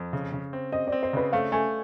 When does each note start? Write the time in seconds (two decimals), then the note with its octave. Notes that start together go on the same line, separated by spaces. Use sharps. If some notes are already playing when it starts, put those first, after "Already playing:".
Already playing: F2
0.13 C#3
0.32 C#3
0.53 C4
0.72 C4 D#5
0.87 D5
0.92 C4
1.03 C5
1.13 C#3 B4
1.33 A3 F5
1.52 A3 G#5